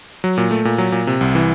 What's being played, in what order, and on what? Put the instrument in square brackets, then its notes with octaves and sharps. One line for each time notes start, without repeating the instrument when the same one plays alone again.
[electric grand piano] F#3
A#2
A3
A#2
F#3
A#2
C3
C2
E3